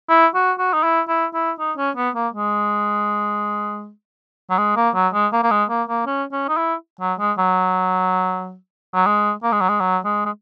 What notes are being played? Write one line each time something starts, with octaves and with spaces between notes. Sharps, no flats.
E4
F#4
F#4
D#4
E4
E4
E4
D#4
C#4
B3
A#3
G#3
F#3
G#3
A#3
F#3
G#3
A#3
A#3
G#3
A#3
A#3
C#4
C#4
D#4
E4
F#3
G#3
F#3
F#3
G#3
A#3
G#3
F#3
G#3
F#3
G#3
G#3